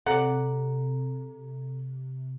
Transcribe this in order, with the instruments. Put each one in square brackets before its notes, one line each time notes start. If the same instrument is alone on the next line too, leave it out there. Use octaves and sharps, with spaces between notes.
[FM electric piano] C3 [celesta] A4 A#5 [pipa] D5 F#5